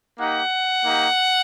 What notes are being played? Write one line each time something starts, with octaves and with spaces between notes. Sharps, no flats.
A#3 D#4 G4 F#5
A#3 D#4 G4